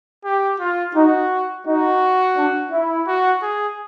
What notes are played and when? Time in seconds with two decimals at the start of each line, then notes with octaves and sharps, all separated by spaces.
0.24 G4
0.59 F4
0.95 D#4 F#4
1.65 D#4 F#4
2.36 D4
2.71 E4
3.07 F#4
3.42 G#4